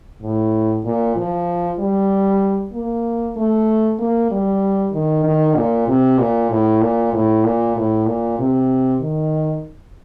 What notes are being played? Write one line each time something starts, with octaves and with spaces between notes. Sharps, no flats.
A2
A#2
F3
G3
A#3
A3
A#3
G3
D#3
D#3
A#2
C3
A#2
A2
A#2
A2
A#2
A2
A#2
C3
D#3